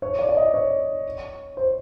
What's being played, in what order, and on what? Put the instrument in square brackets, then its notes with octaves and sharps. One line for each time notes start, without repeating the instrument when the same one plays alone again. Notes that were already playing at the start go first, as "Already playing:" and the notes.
[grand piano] C#5
D5
D5
D#5
C#5
C5